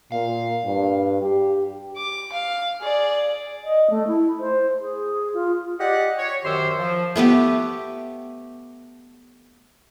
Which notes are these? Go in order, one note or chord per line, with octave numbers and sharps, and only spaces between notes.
A#2 F5
G2
G4
D6
F5
G#4 D5
D#5
A3
E4
C5
G#4
F4
G4 D5 D#5 F#5
C#5
F#2 D#3 G4 C5 C6 E6
F3
A3 B3 G4 B4